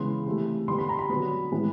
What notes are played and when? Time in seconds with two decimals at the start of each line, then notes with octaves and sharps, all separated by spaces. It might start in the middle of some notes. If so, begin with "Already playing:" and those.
Already playing: C#3 E3 G#3 B3 C6
0.26 C3 E3 A3
0.68 D3 G3 B3 C6
0.78 B5
0.89 A#5
0.99 B5
1.10 D3 F#3 B3
1.52 A2 E3 G#3 B3